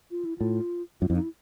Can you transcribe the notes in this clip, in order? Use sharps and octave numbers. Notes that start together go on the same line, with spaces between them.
F4
E4
A2 F4
F#2 F4
F2 E4
D#4
E4